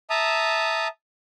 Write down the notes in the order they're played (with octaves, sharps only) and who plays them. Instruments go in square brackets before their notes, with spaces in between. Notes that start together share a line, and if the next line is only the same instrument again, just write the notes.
[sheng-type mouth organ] E5 A5 A#5 D#6